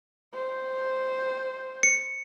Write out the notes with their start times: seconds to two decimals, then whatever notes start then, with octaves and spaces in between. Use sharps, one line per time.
0.34 C5
1.83 C#7